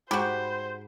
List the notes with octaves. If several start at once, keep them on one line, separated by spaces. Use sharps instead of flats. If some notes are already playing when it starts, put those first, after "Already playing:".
G#2 F#4 G4 C5 G5 B5